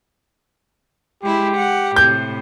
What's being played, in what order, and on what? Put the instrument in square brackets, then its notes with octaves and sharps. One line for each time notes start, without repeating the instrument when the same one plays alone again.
[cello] G#3 E4 [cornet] G4
[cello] F#5
[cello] A2 C3 [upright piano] G6